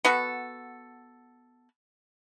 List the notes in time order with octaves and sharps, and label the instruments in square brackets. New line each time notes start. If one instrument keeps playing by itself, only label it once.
[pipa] B3 F#4 A4